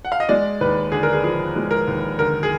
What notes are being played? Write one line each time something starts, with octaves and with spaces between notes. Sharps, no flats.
F#5
F5
D#5
G#3 D5
D#2 B4
D3 G#4
A#4
G#4
F3 G#4
G#3
A#4
D#2
D3 A#4
G#4